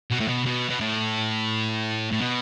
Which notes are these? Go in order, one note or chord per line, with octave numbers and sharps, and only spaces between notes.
B2
A2
B2
B2
B2
A2
A2
B2